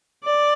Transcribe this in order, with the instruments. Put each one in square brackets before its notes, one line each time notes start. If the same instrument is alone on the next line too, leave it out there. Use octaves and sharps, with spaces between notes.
[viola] D5